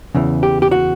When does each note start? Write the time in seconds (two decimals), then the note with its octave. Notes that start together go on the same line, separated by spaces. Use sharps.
0.15 E2 C#3 E3
0.43 G4
0.62 G4
0.71 F#4